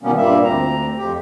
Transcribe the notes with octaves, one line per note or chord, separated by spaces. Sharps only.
B2 D#3 G3 A#3 B3 C#4
G2 A#2 G3 A#3 E5
D2 C4 A#5
F2 G4